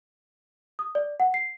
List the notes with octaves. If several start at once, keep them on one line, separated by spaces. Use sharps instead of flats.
D#6
D5
F#5
C7